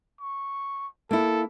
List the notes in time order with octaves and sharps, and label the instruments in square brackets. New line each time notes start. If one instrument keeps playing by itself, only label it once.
[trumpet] C#6
[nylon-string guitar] A#3 E4 [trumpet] A4